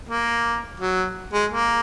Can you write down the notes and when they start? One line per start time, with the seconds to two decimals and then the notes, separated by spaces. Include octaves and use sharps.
0.09 A#3
0.80 F#3
1.33 G#3
1.52 A#3